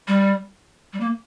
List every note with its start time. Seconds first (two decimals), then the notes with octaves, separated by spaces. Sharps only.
0.08 G3
0.93 G3
1.00 A#3